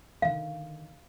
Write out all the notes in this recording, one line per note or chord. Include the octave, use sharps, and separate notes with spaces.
D3 D#3 F5